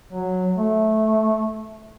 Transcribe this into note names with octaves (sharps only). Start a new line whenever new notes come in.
F#3
A3